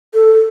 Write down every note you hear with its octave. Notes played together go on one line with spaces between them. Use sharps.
A4